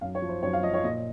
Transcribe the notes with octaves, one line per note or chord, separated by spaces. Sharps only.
F#2 F5
C#5
F3
C5
F#2 C#5
F5
F3 D#5
C#5
A#2 D#5